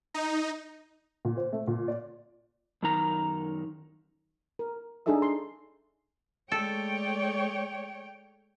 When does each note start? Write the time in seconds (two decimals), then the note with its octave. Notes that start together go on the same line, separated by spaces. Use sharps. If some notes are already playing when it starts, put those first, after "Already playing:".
0.14 D#4
1.25 A#2
1.37 C5
1.52 A3
1.67 A#2
1.88 D5
2.83 F#2 D#3 A#5
4.59 A#4
5.06 D4 D#4 G#4 A4 E5 E6
5.22 C6
6.52 G#3 A3 A4 C#5 D5 G5